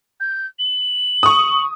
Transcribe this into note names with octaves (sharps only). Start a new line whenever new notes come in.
G6
F#7
C#6 D#6